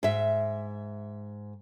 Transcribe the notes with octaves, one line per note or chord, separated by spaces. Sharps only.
G#2 E5